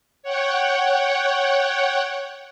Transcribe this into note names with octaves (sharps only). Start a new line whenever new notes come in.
C#5 F#5 G5